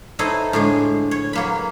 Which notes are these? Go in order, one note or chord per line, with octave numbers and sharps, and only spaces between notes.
D#4 E4 A4 C5 C#5 D#5
A2 D3 G#3
C#5
F#3 A#3 B5